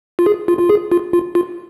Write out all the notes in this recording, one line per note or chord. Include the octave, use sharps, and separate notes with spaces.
F4
G#4
F4
F4
G#4
F4
F4
F4